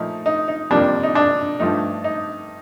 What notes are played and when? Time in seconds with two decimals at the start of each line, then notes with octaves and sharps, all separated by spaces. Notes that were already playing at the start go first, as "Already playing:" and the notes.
Already playing: A#2 F3 A3 D#4
0.26 D#4
0.48 D#4
0.71 F2 C3 G3 A#3 D4
1.03 D#4
1.15 D4
1.59 G2 F3 A3 D#4
2.04 D#4